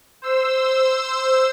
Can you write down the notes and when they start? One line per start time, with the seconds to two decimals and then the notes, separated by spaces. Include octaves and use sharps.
0.22 C5 E6